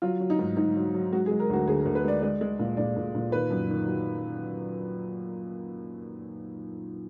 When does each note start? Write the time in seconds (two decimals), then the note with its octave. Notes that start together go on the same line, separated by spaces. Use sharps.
0.02 F#3 F4
0.20 F#3
0.30 D#4
0.39 G#2
0.57 G#2 D#4
0.76 F#3
0.94 F#3
1.12 G#3 F#4
1.26 G#4
1.31 G#3
1.40 A#4
1.50 D2 F#4
1.67 D2 G#4
1.81 A#4
1.85 D2
1.95 B4
2.05 G#3 D5
2.22 G#3 D5
2.41 G#3
2.59 A#2
2.77 A#2 D5
2.96 A#2
3.15 A#2
3.32 D#3 B4
3.50 F#2
3.69 D#3
3.87 F#3